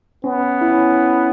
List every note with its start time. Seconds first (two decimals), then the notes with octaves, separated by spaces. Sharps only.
0.24 B3 C#4
0.61 E4
0.71 C#4